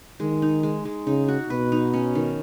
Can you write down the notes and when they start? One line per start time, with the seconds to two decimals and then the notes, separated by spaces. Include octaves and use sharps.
0.20 D#3 G#3
0.42 D#4
0.63 G#3
0.85 G#3
1.07 C#3 D#4
1.28 F#4
1.50 B2 B4
1.72 D#4
1.93 C#4
2.15 D#3